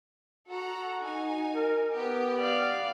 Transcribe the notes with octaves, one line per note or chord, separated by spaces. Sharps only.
F#4 A4 F#5 A#5
D#4 G#5
A#4
B3 G4
D5 F5